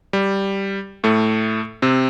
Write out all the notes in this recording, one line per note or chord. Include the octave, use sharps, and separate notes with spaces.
G3
A2 A3
C3 C4